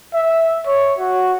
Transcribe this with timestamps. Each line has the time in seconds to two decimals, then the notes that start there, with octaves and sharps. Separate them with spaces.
0.14 E5
0.67 C#5
0.99 F#4